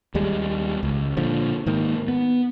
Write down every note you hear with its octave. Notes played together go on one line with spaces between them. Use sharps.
D#2 G3 G#3
C#2
A#2 D3 F3
G#2 D#3 A#3
B3